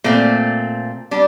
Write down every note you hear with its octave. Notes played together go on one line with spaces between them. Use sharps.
A#2 A3 C4
G3 D4